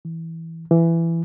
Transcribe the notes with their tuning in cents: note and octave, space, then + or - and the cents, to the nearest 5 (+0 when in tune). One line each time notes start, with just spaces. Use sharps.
E3 -10
E3 +15